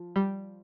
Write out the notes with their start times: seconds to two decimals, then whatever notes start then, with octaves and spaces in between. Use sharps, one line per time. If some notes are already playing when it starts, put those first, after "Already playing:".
Already playing: F3
0.16 G3